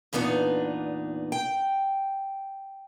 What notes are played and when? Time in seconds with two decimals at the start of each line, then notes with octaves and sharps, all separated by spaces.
0.13 E2 A#2 B3 D4 D#4
1.32 G5